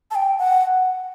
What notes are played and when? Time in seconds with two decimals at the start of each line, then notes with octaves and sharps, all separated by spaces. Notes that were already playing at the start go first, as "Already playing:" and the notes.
0.11 A5
0.15 G5
0.38 F#5